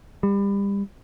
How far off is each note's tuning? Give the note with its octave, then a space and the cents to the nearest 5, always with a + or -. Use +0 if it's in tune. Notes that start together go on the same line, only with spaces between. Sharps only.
G3 +30